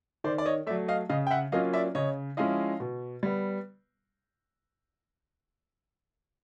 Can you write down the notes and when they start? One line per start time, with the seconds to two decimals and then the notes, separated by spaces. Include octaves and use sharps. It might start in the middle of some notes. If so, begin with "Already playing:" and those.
0.24 D#3 C5 D5
0.38 D5
0.46 C#5 D#5
0.67 A3 D5 E5
0.70 F#3
0.88 D#5 F5
1.09 C#3 D#5 F5
1.27 G5
1.31 E5 F#5
1.52 F#3 A#3 C#4 F4 D#5 F5
1.74 D5 E5
1.95 C#3 C#5 D#5
2.37 F3 G#3 C#4 E4 D#5 F5
2.80 B2
3.23 G3 B3